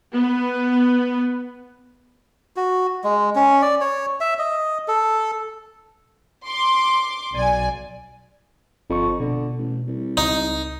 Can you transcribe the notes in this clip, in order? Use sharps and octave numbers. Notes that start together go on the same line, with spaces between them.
B3 B4
F#4
G#3
C#4
D5
C#5
E5
D#5
A4
C6 D6
B1 D5 G#5
G1 F2 C#6
B2 D3
A1
C2
C#2 D#4